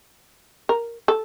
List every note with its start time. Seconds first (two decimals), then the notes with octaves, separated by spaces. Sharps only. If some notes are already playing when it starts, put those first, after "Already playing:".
0.69 A#4
1.08 A4